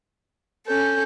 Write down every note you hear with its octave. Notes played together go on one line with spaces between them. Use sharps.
C#4 A4 G6